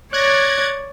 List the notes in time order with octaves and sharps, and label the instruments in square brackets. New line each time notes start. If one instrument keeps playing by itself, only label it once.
[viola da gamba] C#5 D5 [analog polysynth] F#6 G#6 A#6